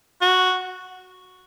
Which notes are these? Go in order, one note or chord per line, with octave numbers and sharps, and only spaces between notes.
F#4